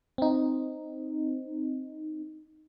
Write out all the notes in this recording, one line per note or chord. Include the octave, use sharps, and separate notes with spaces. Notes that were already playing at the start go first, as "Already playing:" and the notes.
C4 D#4